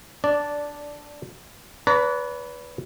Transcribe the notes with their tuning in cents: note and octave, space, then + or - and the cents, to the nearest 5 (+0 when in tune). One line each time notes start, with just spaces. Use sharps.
D4 +0 D5 -10
B4 +0 D5 -45 A#5 -25